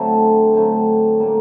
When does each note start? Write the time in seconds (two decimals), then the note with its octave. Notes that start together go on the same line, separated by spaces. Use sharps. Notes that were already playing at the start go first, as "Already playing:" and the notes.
Already playing: D3 F#3 A3 C4 A4
0.54 D3 F#3 A3 C4
1.20 A2 G3 A#3